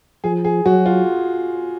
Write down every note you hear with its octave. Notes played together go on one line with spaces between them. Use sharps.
F3 G#4
G#4
F#3 F#4
F4